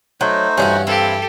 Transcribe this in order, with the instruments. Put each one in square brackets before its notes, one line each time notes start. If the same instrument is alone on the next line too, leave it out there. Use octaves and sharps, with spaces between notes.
[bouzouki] F#3 [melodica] A3 D#4 C5
[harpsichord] G2 E3 [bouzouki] C#4 D4 F#4
[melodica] C4 F5 [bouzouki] E4 [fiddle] G4 A4